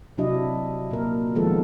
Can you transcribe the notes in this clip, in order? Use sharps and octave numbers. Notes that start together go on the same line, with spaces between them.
C3 F#3 D4 E4 D#5
A#2 A#4
D#3 F3 G#3 B3 F4 A4